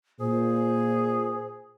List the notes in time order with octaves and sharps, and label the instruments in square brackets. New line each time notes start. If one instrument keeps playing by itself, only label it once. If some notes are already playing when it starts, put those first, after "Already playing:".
[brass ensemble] A#2 [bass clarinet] G#4 [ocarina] C5